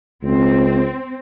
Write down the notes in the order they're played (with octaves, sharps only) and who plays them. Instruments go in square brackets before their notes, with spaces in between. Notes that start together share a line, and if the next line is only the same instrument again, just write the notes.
[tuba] C#2 [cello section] C4